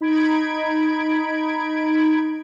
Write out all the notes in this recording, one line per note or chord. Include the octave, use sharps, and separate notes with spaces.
D#4 B5 G#6 D7